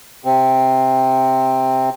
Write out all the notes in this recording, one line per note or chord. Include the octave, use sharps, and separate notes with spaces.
C3 C4